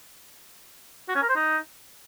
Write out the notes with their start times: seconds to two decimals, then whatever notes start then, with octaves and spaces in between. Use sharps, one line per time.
1.09 F#4
1.15 C#4
1.22 A#4
1.29 C5
1.36 D#4